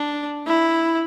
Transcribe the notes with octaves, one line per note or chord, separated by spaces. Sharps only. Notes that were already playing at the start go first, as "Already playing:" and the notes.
Already playing: D4
E4